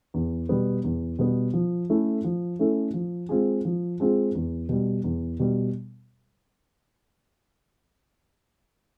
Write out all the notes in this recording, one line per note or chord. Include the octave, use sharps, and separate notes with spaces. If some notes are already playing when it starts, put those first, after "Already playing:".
E2
B2 G3 B3
E2
B2 G3 B3
F3
A3 C#4 E4 A4
F3
A3 C#4 E4 A4
F3
G#3 C4 F4 G#4
F3
G#3 C4 F4 G#4
E2
B2 G3
E2
B2 G3